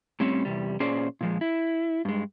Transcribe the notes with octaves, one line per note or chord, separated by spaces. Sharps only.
A2 G3 C4 C#4
E2 C3 G3
A#2 C#4 G#4 C5 D5
A#2 F3 G#3
E4
G2 G#3